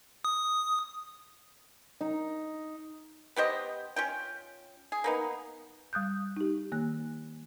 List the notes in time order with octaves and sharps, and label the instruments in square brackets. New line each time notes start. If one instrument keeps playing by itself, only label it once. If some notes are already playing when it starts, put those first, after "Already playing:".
[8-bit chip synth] D#6
[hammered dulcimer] D#4
[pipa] B3 G4 C5 D#5
C#4 F4 G5
G#4
A#3 B3 D#4
[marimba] G3 D#6 F#6 G6
D#4 G4
D#3 A#3 F#6